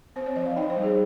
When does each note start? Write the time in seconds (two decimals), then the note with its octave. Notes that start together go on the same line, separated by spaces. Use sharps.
0.16 C4 C5
0.26 C#5
0.36 F3 D#5
0.46 F5
0.56 D#4 G5
0.70 C5
0.77 G3
0.83 G#4